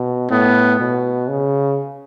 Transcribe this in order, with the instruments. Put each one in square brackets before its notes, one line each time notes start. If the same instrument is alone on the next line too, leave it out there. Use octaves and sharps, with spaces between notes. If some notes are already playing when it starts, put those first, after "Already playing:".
Already playing: [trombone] B2
[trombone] A2 [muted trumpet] B3
[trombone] B2
C#3